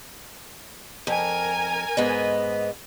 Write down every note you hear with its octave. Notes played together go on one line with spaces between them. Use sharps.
F2 A#4 G#5
G#2 B3 D#5